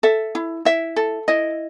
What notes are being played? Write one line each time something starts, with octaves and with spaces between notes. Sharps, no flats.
A4 E5
E4
E4 E5
A4
E4 D#5